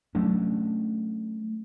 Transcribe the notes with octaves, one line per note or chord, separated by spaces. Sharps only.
F#3 A3 C#4 D4